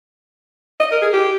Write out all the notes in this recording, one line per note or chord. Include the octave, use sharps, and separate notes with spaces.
D#5
A#4
G#4
G4